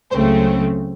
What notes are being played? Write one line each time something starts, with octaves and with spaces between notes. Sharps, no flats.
C#2 C#3 F#3 A3 C4 C5